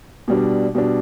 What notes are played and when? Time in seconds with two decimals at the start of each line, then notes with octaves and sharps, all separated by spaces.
0.28 B2 G3 D4
0.75 B2 G3 D4